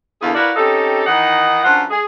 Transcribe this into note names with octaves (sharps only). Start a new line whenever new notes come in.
E2 D3 E3 A#3 G#4 F5
E4 F#4 A#4 B4 D5 F5
C4 C#4 D#4 G4 A4
D#3 E3 D#4 D#5 F#5
F#2 D4 F4 B4 C5 F#5
G#4